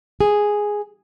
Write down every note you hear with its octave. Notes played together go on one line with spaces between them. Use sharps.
G#4